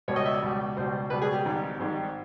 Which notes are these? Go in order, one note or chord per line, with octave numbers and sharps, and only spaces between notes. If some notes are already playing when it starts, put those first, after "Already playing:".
C#2 B2 G3 C#5
D#5
E5
D5
C#2 B2 G3
C#2 B2 G3 C5
C#2 B2 G3 B4
G#4
G4
G#1 G#2 D#3 G3
G#1 G#2 D#3 G3